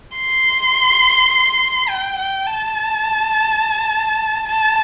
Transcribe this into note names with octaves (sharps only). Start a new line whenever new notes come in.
C6
G5
G5
A5
A5